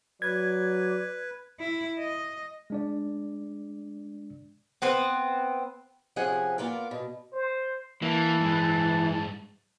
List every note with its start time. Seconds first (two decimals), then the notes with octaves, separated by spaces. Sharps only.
0.22 F#3 B4 D5 G#6
1.59 E4
1.99 D#5
2.70 G#3 D4 D5
4.82 B3 C4 B4
6.16 C3 F3 C#4 G#4 F#5 G#5
6.58 A#3 B3 F4 A#4 D5
6.91 B2
7.33 C5
8.02 E3 A#3 A5
8.41 G2 G#3